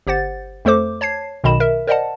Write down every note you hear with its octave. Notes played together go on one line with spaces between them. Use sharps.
G1 G4 C5 F#5 A6
F2 A3 A4 C5 D6
C#5 A5 G#6 C7
B1 B2 D#3 D#5 B5 E7
A#4 E5
A#4 C5 D5 D#5 F#5 A5